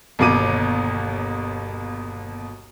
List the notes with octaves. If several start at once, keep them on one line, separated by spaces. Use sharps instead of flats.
G1 D#2 B2 D6 D#7